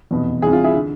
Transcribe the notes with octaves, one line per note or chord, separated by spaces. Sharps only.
F1 E2 B2
C2 C3 E3 G#4
F4
E4 G#4
D3